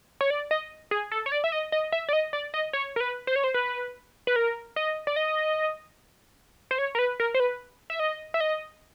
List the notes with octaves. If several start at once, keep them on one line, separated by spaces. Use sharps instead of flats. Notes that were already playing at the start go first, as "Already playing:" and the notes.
C#5
D5
D#5
G#4
A4
C#5
D5
E5
D#5
D#5
E5
D5
D#5
D5
D#5
C#5
A#4
B4
C5
C#5
C5
B4
B4
A#4
D#5
D5
D#5
C5
C#5
A#4
B4
A#4
C5
B4
E5
D#5
E5
D#5